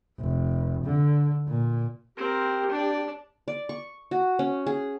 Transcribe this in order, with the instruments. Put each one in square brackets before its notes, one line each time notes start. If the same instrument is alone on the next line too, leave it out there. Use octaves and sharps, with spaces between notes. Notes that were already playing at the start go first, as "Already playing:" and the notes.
[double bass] F1
D3
A#2
[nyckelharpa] C4 A#4 [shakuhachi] G4
[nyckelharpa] D4 D5
[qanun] D5
C#6
F#4
C#4
G#4